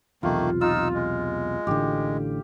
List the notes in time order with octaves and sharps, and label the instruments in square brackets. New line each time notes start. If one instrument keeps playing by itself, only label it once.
[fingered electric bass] B1 E2 C3 [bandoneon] D#3 A3 A#3 [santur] F4
[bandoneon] D#4 E6 [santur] F4
[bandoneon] G#3
[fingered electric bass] A1 A2 D3 [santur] G4